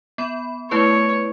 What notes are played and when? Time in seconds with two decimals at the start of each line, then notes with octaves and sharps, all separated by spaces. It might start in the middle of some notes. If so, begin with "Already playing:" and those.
0.18 B3 B5
0.71 A3 E4 B4 C#5